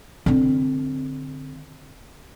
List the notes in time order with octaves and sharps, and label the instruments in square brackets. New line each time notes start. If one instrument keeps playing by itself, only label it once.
[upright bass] D3 C4